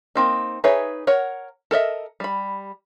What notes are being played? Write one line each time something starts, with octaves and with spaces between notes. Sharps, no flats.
A#3 C4 D#4
D#4 G#4 B4 C#5 E5
A#4 C#5 F#5
A4 A#4 D#5 E5
G3 B5